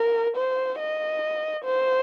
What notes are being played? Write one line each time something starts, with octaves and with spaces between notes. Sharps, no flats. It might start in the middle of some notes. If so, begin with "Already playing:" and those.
Already playing: A#4
C5
D#5
C5